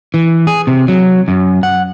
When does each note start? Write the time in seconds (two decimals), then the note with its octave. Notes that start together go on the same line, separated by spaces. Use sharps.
0.14 E3
0.47 G#4
0.67 C3
0.88 F#3
1.28 F#2
1.63 F#5